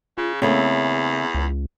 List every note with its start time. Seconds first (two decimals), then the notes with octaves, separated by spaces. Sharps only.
0.18 C#3 F4
0.42 E2 C#3 A3 A#3 C4
1.34 C#2